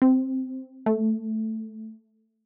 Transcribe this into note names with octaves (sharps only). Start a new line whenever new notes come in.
C4
A3